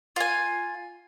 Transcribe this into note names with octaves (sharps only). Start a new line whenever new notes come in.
F4 G#5